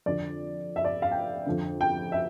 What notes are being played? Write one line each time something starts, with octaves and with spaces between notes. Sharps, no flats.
F2 D3 D5
E5
D5
F5
G5
F2 D3
G5
E5